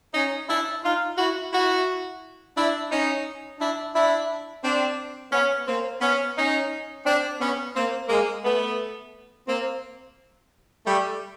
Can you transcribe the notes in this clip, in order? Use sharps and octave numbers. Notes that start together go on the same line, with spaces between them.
C#4 D#4
D4 E4
D#4 F4
E4 F#4
E4 F#4
D4 E4
C#4 D#4
D4 E4
D4 E4
C4 D4
B3 C#4
A#3 C4
B3 C#4
C#4 D#4
C4 D4
B3 C#4
A#3 C4
G#3 A#3
A3 B3
A#3 C4
G3 A3